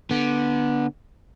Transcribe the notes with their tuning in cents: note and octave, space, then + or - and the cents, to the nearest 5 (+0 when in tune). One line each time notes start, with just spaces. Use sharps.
D3 +0 B3 -15